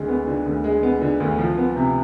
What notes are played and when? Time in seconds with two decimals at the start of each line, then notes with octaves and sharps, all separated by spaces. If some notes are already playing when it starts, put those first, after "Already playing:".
Already playing: D2 D3 G#3
0.09 B3
0.27 D3
0.46 D2
0.64 G#3
0.83 B3
1.01 D3
1.20 D2
1.39 F3
1.58 B3
1.76 C3